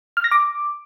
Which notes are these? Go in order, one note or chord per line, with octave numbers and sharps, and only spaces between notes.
F6
A#6
D6